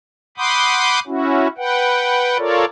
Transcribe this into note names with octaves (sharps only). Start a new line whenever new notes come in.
F#5 B5 C6 D6 D#6 G6
C#4 E4 F#4
B4 F#5 G5
F4 A4 A#4 C#5 D5